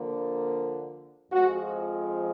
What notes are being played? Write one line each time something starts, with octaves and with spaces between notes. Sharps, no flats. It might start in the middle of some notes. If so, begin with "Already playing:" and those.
Already playing: D3 F3 A#3
F2 F3 G#3 F#4